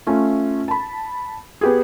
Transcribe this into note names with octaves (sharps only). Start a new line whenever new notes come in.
A3 C#4 F4
A5 B5
B3 G4 G#4